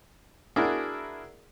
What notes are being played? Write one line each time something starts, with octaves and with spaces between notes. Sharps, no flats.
D4 E4 F#4 G#4 A#4